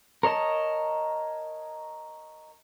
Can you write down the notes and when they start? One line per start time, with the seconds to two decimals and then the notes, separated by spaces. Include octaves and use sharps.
0.23 A#4 C#5 D#5 A5